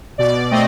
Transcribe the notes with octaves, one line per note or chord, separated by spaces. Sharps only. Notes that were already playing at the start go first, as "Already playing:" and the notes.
B2 D5
A3 C4 D#5